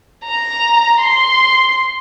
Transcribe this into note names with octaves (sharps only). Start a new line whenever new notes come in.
A#5
C6